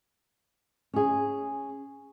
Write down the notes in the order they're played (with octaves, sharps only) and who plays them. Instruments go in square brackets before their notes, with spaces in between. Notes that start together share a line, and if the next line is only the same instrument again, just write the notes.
[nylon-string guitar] C#4 G#4